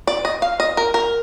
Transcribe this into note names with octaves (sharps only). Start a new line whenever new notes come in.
D5
D#5
F5
D#5
A#4
A#4